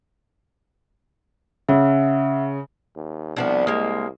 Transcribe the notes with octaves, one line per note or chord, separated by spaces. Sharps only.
C#3 E5 F#5
D#2
C2 F3 B3 D4
G#3 A#3